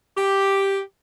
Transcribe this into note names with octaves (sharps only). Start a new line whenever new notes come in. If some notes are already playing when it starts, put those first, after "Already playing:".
G4